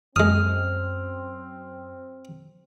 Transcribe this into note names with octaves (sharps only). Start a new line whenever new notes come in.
F#2 G#3 C4 D#6 F6